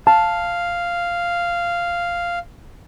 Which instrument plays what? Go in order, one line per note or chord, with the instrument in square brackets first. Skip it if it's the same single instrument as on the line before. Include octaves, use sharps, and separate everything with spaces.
[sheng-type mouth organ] F5 [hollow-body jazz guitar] A5